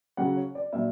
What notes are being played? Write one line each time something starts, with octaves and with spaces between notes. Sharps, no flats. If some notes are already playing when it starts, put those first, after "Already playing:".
C#3 F#3 F#5
C#5
D5
A#2 F#3 E5